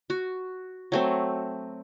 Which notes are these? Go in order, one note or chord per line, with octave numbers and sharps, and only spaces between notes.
F#4
F#3 A3 C4